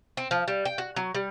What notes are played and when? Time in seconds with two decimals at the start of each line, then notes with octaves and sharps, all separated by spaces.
0.17 C4
0.31 F3
0.48 G3
0.65 G5
0.78 F#4
0.96 F#3
1.15 G3